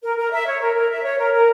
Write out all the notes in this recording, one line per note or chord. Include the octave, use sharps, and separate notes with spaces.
A#4
A#4
E5
C#5
A#4
A#4
E5
C#5
A#4
A#4